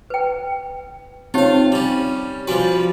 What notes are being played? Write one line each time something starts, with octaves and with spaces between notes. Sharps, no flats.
B4 G5
C4 D#4 F4 G4 C#5 F5
G3 C#4
F3 G3 F#4 B4 G#5